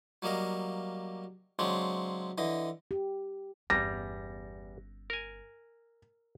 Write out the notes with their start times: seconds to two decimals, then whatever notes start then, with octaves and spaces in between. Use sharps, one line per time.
0.22 F#3 G3 A#3 D#5 F5
1.59 C#3 F#3 G#3 C4 D4
2.38 D3 E3 D#5
2.91 G4
3.70 G1 E2 G3 C#4 A#6
5.10 A#4 G#5